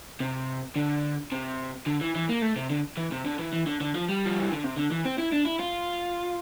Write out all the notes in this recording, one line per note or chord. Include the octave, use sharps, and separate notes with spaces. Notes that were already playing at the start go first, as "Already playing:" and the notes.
C3
D3
C3
D3
E3
E3
A#3
A3
C3
D3
E3
C3
D3
E3
E3
D3
D3
F3
G3
F3
E3
D3
C3
D3
E3
C4
E4
D4
E4
F4